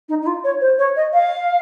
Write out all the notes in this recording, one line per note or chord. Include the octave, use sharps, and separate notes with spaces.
D#4
D#4
F4
C#5
C5
C#5
D#5
F5